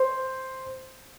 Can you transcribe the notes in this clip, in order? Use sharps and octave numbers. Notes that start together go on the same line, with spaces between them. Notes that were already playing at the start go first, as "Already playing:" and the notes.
Already playing: C5